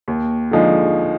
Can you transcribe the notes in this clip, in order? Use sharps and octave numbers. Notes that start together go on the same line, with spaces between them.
D#2
D3 F3 G#3 D#4